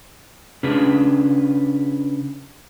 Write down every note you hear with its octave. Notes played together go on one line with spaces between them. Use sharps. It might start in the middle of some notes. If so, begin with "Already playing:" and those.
C#3 C#4 D4 F4 G#4 B4